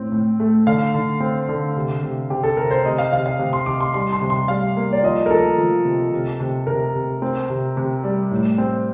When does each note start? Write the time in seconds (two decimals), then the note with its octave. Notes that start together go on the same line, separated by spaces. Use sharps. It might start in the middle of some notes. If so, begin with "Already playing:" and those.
Already playing: A2 C4
0.12 A2
0.40 A3
0.67 D3 F5
0.94 D3
1.20 C4
1.49 D3
1.76 C3
2.03 C3
2.30 C3 G4
2.43 A4
2.57 C3 A#4
2.71 C5
2.85 C3 D#5
2.98 F5
3.12 C3 F5
3.26 F5
3.39 C3
3.53 C6
3.66 C3 D6
3.80 C6
3.94 G3 C6
4.13 C6
4.22 C3
4.30 C6
4.48 G3 F5
4.77 A#3
4.93 D5
5.03 F3 D#5
5.26 A#4
5.30 F3 A4
5.58 F3
5.85 C3
6.12 C3
6.40 C3
6.67 C3 A#4
6.95 C3
7.22 C4
7.50 C3
7.77 C3
8.04 G3
8.31 A2
8.58 C4